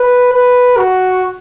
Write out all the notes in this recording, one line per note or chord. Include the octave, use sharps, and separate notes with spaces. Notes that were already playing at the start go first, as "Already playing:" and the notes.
Already playing: B4
B4
F#4